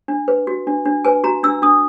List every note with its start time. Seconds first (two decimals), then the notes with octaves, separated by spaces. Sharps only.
0.08 D4
0.28 B4
0.47 F#4
0.67 D4
0.85 D4
1.05 B4 G#5
1.24 F#4 A#5
1.43 D4 E6
1.62 D4 D#6